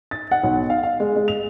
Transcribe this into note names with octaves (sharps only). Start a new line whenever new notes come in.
A6
F#5
B1
F5
F5
G#3
G#3
F7